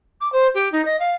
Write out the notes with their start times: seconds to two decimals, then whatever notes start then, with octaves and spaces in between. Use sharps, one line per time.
0.20 D6
0.32 C5
0.54 G4
0.72 D#4
0.85 D#5
0.99 F5